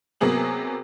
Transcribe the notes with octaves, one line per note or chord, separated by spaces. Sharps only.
C3 F#3 A#3 B3 G#4 F#7